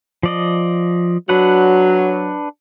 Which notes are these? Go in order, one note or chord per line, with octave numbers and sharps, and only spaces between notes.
F3 D5 D#5
F#3 D4 B4 F#5